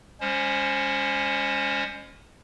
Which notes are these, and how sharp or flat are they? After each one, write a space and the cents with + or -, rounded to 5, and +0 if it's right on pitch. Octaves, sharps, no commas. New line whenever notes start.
G#3 -45 C#4 +0 C5 +20